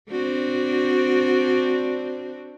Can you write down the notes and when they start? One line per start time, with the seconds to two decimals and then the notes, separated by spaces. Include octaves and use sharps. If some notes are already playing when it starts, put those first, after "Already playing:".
0.11 C4 D4 F#4